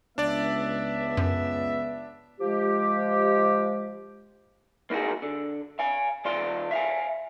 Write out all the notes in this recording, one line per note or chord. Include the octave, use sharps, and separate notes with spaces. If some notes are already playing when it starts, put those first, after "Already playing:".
C#2 B3 D4 D5 E5
F#2
F3 G#3 G4
A#3 D#4 F4 F#4 G#4
D3
F5 G#5
D#3 F4 D5 F5 C6
E5 F5 G#5